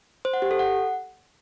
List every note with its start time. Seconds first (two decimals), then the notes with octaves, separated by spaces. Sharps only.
0.25 C5
0.33 F#5
0.42 G4
0.51 A4
0.59 F#5